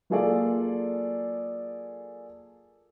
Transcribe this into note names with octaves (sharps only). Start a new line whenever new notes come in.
F#3 A#3 F4 G#4 A4 D5